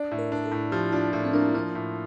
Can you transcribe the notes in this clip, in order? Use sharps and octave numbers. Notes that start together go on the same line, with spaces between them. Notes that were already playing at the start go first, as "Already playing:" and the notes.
Already playing: D4 D5
A2
A#4
D4 A#4
A4
A2
F3 G4
D4 F4
A2 E4
C4
A#3 D4
F3 D4
A2